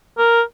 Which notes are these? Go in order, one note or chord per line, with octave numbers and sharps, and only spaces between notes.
A#4